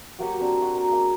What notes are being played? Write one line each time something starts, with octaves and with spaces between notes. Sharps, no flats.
F#3 A#3 G4 C#5
C4 D4 A#4
F#4
A#5 C6
A#3 C#4 G#4